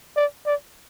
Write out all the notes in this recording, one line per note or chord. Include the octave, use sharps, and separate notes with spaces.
D5
D5